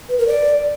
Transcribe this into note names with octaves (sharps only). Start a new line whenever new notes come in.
B4
A#4
D5